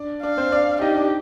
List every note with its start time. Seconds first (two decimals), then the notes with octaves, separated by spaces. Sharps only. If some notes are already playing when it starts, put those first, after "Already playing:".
Already playing: D4 D5
0.23 D4 D5 F5
0.37 C4 C5
0.52 D4 D5
0.81 D#4 G4 D#5
0.95 D4 D5